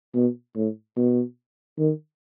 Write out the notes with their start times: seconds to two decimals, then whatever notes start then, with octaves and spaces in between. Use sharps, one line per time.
0.15 B2
0.56 A2
0.97 B2
1.79 D#3